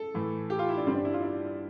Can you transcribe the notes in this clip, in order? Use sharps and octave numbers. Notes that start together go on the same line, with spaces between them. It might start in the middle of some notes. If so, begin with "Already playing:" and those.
Already playing: A4
A2 E3 A3
G4
F4
E4
D4
G2 D3 G3 C4
D4
E4
F4
D4